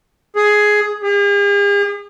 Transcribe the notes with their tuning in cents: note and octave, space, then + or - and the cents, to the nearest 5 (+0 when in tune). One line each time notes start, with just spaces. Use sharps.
G#4 +10
G#4 -45